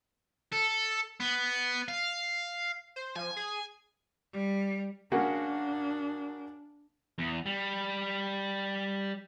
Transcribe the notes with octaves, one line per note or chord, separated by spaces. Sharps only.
A4
B3
F5
C5
F3 G#5
G#4
G3
C#3 A#3 D4 F#4
E2
G3